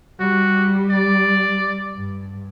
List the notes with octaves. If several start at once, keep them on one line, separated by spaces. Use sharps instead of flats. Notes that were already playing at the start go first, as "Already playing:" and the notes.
G3 F#4
D5
G2